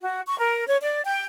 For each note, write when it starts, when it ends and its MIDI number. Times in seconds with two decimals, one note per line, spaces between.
0.02 0.21 66
0.26 0.38 85
0.38 0.66 70
0.67 0.77 73
0.82 1.02 74
1.05 1.24 79